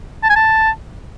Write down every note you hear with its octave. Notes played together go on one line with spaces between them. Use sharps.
A5
G#5
A5